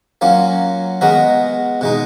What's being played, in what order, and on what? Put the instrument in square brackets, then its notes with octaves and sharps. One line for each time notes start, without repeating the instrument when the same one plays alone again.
[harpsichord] F#3 A#3 C#4 F4
G#3 B3 F#4 A#4
B2 G#3 D#4